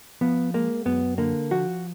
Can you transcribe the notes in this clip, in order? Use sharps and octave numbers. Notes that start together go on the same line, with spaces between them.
F3 B3
G#3 A#3
F#2 B3
D3 A#3
F3 F#4